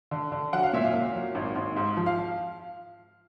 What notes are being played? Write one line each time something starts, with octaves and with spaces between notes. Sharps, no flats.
D3
D3
F#3 F#5
F5
A#2 E5
F5
A#2
F#3
G#1
G#1
G#2
F3
F5